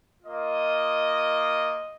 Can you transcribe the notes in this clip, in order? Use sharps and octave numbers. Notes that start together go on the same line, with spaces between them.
A#3 F4 D#5